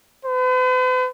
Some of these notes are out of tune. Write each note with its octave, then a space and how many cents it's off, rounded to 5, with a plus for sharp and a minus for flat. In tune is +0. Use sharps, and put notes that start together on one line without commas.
B4 +45